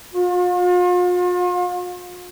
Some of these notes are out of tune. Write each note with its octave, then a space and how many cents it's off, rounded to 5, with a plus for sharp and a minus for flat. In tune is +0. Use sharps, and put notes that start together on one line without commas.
F4 +40